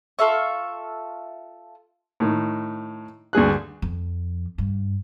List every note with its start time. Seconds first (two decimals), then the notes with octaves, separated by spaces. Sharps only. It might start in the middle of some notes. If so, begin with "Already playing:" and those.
0.19 F4 A4 E5 C#6
2.20 A2 D#3
3.33 D2 G2 G#4 F#6
3.82 F2
4.58 G2